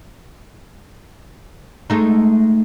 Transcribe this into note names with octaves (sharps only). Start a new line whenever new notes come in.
G#3 A3 D#4